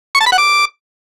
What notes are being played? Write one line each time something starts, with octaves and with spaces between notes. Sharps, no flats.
C#6
A5
B5
F#5
D6